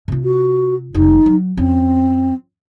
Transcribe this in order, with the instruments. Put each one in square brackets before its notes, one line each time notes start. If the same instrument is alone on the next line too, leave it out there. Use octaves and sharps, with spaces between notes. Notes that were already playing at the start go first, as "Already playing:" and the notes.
[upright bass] C3 F4
[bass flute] F#4
[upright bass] F1 G3 [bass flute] D#4
[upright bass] F#3
[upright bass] F2 C#4 [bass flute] C4